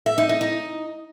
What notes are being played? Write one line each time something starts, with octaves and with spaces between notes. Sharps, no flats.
E5
D#4
D#4
D#4